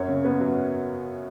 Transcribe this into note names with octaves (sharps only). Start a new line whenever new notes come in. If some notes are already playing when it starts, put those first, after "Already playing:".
Already playing: F#2 C#5
C#3
B3
F#3